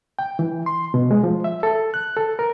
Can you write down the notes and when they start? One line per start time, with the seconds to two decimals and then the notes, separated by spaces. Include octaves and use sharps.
0.19 G5
0.39 E3
0.66 C6
0.94 B2
1.11 G#3
1.23 F3
1.44 E5
1.63 A4
1.94 F#6
2.17 A4
2.39 A#4